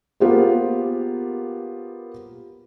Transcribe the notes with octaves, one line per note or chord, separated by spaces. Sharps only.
A#3 B3 F4 G4 G#4 C5